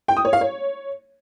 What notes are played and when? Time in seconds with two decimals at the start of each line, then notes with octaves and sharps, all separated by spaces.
0.08 G5
0.17 D#6
0.25 C#5
0.33 F5
0.41 C#5